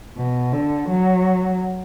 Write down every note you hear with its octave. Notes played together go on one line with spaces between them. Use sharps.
B2
D3
F#3